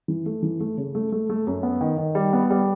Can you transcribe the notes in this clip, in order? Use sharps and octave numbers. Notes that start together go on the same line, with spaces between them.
E3
A3
E3
A3
C#3
A3
A3
A3
F#2
B3
D#3
D#3
G3
B3
G3